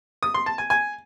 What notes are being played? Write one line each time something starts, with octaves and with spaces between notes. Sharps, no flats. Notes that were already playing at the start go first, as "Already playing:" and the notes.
D#6
C6
A5
G#5
G#5